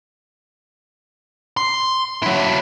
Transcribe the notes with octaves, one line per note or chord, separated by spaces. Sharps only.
C6
F#3 E4